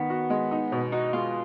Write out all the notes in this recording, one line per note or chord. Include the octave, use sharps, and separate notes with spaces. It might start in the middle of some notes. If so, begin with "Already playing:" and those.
Already playing: D#3 B3
F#4
G#3
D#4
B2
D#4 F#4
G#3 F4